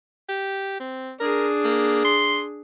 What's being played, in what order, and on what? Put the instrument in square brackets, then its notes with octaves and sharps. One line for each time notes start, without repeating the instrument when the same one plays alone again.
[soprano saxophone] G4
C4
[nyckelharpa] D4 G#4 [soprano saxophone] A#4
[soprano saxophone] A#3
C6